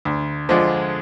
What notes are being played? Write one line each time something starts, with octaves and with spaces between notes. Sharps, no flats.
D2
D3 F3 G#3 D4